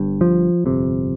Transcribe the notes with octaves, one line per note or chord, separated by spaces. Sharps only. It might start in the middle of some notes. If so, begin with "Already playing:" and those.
Already playing: G1 G2
F3
G1 F2 C3